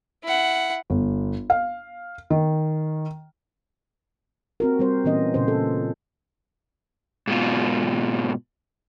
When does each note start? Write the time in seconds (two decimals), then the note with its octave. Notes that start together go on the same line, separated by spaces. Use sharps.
0.24 E4 F#5
0.90 G1
1.50 F5
2.30 D#3
4.60 C4 F#4 A#4
4.79 G3 C4 C5
5.04 A#2 E3 B3 C#4 D#5
5.34 A#2 C#3 C5
5.48 A4
7.27 G#2 B2 F4